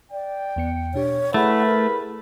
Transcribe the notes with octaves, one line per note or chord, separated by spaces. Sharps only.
D5 G5
E2 B3 C#7
B2 D4 G4 C#5
A3 E4 G#4 B4 F#5 B5
A#4